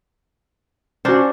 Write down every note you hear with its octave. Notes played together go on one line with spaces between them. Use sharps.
C#4 D4 F#4 C5